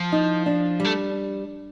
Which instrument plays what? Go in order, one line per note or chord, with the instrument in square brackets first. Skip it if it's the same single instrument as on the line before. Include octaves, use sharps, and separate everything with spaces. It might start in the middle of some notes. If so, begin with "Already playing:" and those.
Already playing: [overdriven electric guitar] F3
[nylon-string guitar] D#4
D4
[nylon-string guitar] G3 [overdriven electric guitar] A3